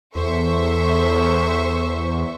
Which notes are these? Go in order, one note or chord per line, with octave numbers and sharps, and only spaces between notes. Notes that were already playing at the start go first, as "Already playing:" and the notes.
E2 A4 C5 E5 C#6